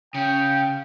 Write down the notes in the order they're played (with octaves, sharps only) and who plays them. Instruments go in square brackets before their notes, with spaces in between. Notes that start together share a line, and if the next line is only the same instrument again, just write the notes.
[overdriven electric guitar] C#3 [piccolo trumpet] G5